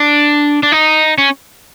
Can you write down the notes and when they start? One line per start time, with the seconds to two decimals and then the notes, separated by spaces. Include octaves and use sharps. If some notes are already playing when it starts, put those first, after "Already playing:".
Already playing: D4
0.63 D4
0.72 D#4
1.18 C#4